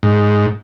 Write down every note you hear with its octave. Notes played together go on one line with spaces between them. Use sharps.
G#2